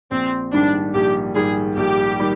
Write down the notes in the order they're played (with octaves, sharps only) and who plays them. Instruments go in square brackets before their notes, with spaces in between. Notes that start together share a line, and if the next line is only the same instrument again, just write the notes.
[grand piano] A#1 [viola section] C4
[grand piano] G#2 D#3 G3 [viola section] D4
[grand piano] A#1 [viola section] G4
[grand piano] G#2 D#3 G3 [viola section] G#4
[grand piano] A#1 [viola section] G4
[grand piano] D#3 G3